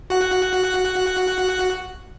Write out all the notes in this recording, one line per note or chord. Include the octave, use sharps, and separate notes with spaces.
F#4 F#5